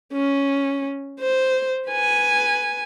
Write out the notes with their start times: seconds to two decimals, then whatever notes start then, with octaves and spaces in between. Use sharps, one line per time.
0.13 C#4
1.20 C5
1.89 B4 G#5